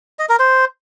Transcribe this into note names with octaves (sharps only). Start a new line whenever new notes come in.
D#5
A#4
C5